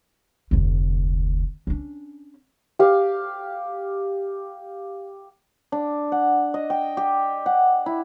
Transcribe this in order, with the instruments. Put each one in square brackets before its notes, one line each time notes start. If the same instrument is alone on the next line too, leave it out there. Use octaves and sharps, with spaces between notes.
[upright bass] F1 D2
C#4 D4
[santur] G4 F5
[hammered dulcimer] D4
F#5
D#5
G5
G4
F#5
E4